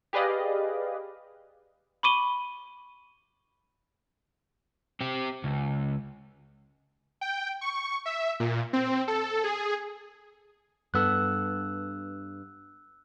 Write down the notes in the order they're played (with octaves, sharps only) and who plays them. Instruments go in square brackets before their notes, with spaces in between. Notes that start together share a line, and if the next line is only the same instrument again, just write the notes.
[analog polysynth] G4 G#4 B4 D5 D#5 F5
[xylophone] B5 C#6 D6 D#7 G7
[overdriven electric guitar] C4 G4
C#2
[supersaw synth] G5
C#6
E5
A#2
C4
A4
G#4
[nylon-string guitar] G2 B3 A4 [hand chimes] E6 F#6